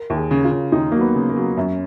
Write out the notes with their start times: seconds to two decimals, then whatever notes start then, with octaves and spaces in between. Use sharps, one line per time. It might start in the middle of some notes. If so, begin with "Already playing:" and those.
Already playing: A#4
0.10 D#2
0.17 G#4
0.31 C#3
0.44 F4
0.51 C#3
0.72 D#2 D#4
0.92 F#3 A#3
1.01 B3
1.15 C#3
1.29 A#3
1.36 F#3
1.57 F#2 C#4